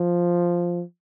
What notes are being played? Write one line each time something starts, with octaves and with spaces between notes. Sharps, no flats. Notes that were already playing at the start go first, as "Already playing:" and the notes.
Already playing: F3